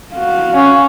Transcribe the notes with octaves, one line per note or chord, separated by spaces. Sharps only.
F#4 F5
C#4